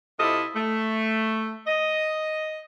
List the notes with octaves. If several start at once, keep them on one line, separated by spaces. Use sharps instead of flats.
C3 E4 F4 A4 D#5
A3
D#5